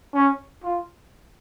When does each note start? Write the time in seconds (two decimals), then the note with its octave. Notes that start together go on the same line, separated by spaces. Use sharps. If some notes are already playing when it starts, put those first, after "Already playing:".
0.14 C#4
0.63 F4